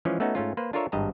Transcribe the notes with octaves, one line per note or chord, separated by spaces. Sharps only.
E3 F3 G#3 C#4 G#4
A3 B3 C#4 D#4 F#4
G#2 A3 C#4 F4
A#3 B4 C5
D4 F4 A4 A#4 C#5 E5
G#1 G2 D#5 A5 A#5